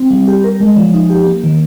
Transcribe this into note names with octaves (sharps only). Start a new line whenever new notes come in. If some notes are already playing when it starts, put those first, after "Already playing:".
Already playing: C4
G3
G4
A#4
G#3
F3
D#4
G4
A#3
D#3